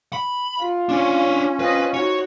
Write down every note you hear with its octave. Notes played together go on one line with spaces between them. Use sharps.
B5
F4
C#4 D4 C#5
C4 F4 B4 D#5
D#4 F#4 C#5